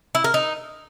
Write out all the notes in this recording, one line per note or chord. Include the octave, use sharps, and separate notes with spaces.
E4
A#4
D#4